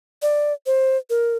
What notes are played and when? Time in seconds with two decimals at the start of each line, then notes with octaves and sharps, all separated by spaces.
0.22 D5
0.66 C5
1.10 A#4